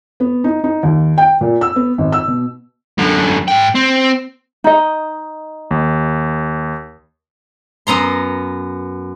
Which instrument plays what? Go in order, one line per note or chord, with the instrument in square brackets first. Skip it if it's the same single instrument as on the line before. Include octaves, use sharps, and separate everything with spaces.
[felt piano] B3
D#4
D#4
D#2
G5
A#2
E6
B3
G#1
E6
B2
[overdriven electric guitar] F#2 D3
G#2 G5
C4
[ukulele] D#4 D#5
[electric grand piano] D#2
[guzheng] F#2 B3 A#5 C6